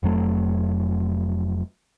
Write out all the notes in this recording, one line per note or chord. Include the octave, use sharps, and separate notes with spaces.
F1 F2 F#3 A3